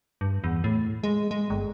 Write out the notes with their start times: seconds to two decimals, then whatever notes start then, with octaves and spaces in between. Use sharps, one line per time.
0.21 G2
0.44 E2
0.64 A2
1.04 G#3
1.31 G#3
1.50 G1